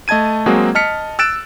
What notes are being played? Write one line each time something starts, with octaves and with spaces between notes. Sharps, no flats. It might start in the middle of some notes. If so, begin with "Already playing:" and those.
A3 D#5 A5 G#6 D#7
F#3 G#3 A#3 C4 F#4 G#4
D#5 A5 F6 B6 C#7
E6 F#6 A6 D7 E7